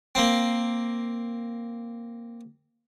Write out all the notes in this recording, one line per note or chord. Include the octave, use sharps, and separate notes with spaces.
A#3 C4